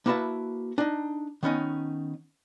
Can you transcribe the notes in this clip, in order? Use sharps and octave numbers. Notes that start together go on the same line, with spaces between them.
A#3 E4 F#4 B4 E5 A5
D4 D#4
D#3 B3 C#4 D#4